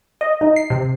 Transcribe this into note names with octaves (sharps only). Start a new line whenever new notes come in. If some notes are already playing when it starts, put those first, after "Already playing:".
D#5
D#4
C7
C3